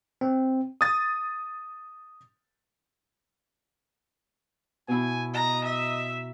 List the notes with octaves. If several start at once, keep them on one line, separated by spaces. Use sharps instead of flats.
C4
D#6 A6
B2 E4 G#5
D#5 A#5
E5